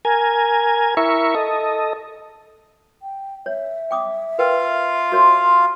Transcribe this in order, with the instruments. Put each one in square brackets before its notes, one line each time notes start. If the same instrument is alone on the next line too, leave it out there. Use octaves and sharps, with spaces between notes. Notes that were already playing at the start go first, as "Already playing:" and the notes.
[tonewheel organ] A#4 G#5
E4 A#4 E5 C#6
A4 D#5
[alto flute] G5
[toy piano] C#5 [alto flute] E5
[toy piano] G5 D6 D#6
[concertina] F4 F5 [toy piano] A#4 B4 G5
[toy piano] F#4 A#4 C#5 [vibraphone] C6